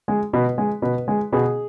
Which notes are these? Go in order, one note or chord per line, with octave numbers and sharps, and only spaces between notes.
G#3
B2 B4
G#3
B2 B4
G#3
B2 G#4